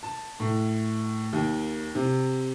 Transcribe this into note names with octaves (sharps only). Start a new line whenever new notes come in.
A5
A2
D#2
C3